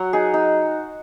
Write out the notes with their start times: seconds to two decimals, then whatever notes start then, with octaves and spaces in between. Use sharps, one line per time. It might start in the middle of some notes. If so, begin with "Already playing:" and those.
Already playing: F#3 F#4
0.13 D#4 G#4
0.34 D#4